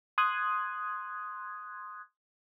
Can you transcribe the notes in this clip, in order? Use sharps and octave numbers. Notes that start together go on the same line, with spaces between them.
C6 D#6 F#6 G#6